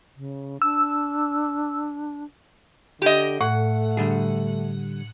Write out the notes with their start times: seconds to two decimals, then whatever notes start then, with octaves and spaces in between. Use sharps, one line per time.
0.16 C#3
0.62 D4 E6
3.02 D3 G4 D#5
3.41 A2 A3 F#5
3.97 D3 G3 G#4